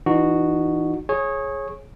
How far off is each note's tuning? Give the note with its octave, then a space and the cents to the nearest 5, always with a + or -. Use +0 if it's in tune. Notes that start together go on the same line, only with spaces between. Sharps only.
E3 +0 D#4 -30 F#4 +0
G#4 +10 C#5 -20